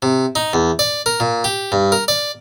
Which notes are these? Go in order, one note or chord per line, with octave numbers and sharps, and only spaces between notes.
C3
D#4
E2
D5
A#4
A#2
G4
G2
A#4
D5